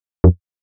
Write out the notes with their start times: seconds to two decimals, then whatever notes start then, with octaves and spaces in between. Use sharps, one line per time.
0.24 F2